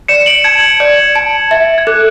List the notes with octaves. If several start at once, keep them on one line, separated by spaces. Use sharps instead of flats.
D5 C#7 E7
D7 F#7
A5 G#6
D5
A5
E5
G#6
A4 F#6